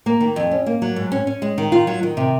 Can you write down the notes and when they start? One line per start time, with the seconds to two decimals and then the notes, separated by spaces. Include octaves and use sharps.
0.06 A#3
0.20 D#3
0.36 F2
0.51 C#4
0.66 A#3
0.82 F#3
0.96 G#2
1.12 C#4
1.27 C#4
1.42 G#3
1.58 D#3
1.72 F4
1.87 F#3
2.03 D#3
2.17 C3